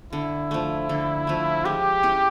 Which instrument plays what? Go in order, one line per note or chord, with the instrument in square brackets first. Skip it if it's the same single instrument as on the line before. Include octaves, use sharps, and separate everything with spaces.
[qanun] D3 [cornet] E4
[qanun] F3 A3
D3
F3 A3
[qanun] G#3 [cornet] G4
[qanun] C#4 E4